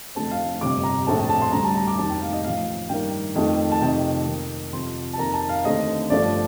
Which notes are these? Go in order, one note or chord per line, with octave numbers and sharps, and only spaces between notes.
F1 F2 D3 A3 C4 A5
F5
G1 F2 C3 D6
A#5
A#1 A2 A3 C4 A5
A5
A5
C6
D2 D3 G3 A#5
A5
A#5
D6
F1 D#2 D#3 A5
G5
F5
D#5
A1 A2 F3 F5
G2 D#3 A#3 G5
F2 D#3 A3
A5
F2 C3 D#3 G5
F2 D#3 A#3
F2 C3 F3 C6
A5
F2 D#3 A#3 A#5
A5
F5
D#2 D3 A3 C4 D#5
G1 G2 F3 A3 D5